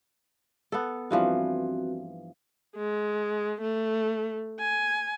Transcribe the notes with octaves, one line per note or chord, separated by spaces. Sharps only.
B3 A4
G2 E3 F3 C4 F#4
G#3
A3
G#5